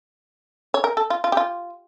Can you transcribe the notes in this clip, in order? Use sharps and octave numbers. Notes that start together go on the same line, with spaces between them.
C#5
A#4
A4
F4
F4
G4
F4